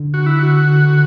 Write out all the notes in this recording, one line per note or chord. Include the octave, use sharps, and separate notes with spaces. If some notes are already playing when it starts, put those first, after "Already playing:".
Already playing: D3
F#4
E4
F#4